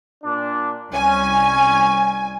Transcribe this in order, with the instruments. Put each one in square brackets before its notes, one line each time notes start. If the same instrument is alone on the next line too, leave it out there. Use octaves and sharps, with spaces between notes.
[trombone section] A#2 D4
[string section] C2 G#5 [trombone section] C#4